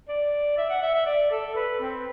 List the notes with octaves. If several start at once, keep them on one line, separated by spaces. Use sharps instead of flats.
D5
E5
F#5
E5
E5
D5
A4
B4
C4